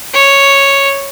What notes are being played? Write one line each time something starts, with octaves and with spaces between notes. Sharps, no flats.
C#5